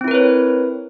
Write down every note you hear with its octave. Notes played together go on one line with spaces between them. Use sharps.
C4 E4 A#4 B4 C#5